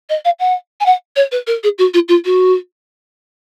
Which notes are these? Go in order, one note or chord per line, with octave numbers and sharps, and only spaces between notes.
D#5
F5
F#5
G#5
F#5
C#5
B4
A#4
G#4
F#4
F4
F4
F#4